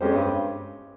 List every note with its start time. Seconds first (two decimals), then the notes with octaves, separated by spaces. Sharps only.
0.01 F2 G#3 C#4 G4 C5
0.15 G2